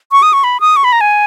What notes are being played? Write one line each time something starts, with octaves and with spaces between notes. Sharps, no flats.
C#6
D#6
C#6
B5
D#6
C#6
B5
A#5
G#5